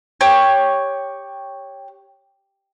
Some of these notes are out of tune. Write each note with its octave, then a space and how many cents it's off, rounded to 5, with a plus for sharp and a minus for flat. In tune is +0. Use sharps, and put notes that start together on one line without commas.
G4 +5 C#5 +0